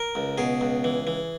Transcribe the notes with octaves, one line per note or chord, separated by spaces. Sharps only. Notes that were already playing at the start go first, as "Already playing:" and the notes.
Already playing: A#4
C#2
B2 G#4
C#2
E3
E3